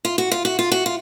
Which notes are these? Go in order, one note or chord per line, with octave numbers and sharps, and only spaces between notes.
F4
F#4
F4
F#4
F4
F#4
F4